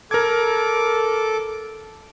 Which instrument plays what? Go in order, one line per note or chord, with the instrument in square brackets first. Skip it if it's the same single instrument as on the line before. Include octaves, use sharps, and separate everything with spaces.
[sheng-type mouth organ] A4 D6 [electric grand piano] A#4 G#6